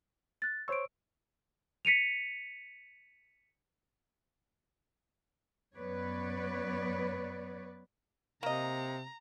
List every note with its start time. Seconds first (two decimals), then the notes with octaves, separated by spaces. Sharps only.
0.42 F#6 A6
0.68 C5 C#5 C#6 E6 D7
1.85 B6 C#7 D#7 F7
5.75 F#2 B3 B4 C#5 D5
8.43 C3 A#3 D#5 A#5